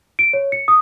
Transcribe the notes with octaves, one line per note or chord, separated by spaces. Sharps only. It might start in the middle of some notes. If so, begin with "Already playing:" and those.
D7
C#5
C#7
D#6